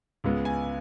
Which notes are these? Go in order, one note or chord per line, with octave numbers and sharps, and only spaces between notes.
C#2 C#3 G#3 B3
G#5